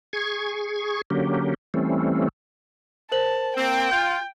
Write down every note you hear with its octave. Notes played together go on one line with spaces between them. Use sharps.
G#4 C#6 G#6
D3 F#3 A#3 C#4 G4
E3 G3 A3 C4 C#4
A#4 C5 A5 F#7
A#3 C4 G5
F4 G6